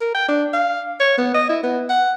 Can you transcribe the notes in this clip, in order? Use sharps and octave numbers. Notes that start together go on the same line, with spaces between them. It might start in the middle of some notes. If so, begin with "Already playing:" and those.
A#4
G5
D4
F5
C#5
B3
D#5
E4
B3
F#5